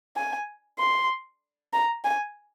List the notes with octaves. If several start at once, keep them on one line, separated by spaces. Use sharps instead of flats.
G#5
C6
A#5
G#5